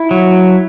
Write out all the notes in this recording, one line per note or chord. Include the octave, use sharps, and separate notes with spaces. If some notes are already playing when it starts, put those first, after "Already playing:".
Already playing: E4
F#3